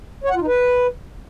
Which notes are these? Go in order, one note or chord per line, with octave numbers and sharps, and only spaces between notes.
C#5
F#5
F4
D#4
B4